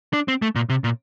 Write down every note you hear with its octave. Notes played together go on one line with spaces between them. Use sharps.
D4
C4
A3
A#2
C3
A#2